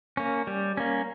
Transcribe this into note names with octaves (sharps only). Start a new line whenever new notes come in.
A#3 C#4
G3
A#3 C#4